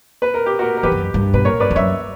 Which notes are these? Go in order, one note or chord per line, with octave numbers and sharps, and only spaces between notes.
B4
A#4
G4
F#4 A#4
A#4
E2 G4 B4
G2
F#2
G2
B2 B4
A#2 A#4 C#5
G2 B4 D5
E2
F#2 C#5 E5